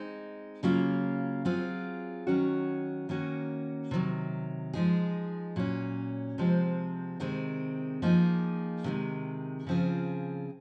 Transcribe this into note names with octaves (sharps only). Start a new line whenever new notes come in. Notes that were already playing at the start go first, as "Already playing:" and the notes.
Already playing: G#3 C4 D#4
C#3 F#3 A#3 F4
F#3 C4 F4 G#4
D#3 F#3 C#4 F#4
D#3 A#3 C#4 F#4
C3 D#3 F#3
F3 G#3 D#4 G#4
A#2 F#3 C#4
C3 F3 G#3 C4
C3 D#3 G#3 C4
F3 A#3 D#4 G#4
C3 D#3 G#3
C#3 F3 C4 F4 G#4